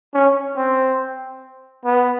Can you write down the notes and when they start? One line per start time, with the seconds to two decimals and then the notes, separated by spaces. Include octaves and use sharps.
0.14 C#4
0.56 C4
1.85 B3